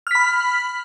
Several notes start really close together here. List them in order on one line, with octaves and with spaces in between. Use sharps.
F6 B6 B5